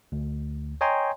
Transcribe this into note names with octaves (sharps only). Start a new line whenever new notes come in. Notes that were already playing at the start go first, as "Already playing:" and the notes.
D2
C#5 D#5 G5 G#5 A#5 C6